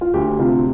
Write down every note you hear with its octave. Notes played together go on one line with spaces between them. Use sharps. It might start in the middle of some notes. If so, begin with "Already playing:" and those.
F4
D2 G4
C3 F4